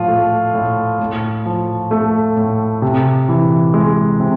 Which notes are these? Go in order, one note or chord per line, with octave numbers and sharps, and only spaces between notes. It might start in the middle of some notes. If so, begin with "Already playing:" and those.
Already playing: A2 F3 F4
A3
A2
A2
F3
A3
A2
C3
E3
G#3
C3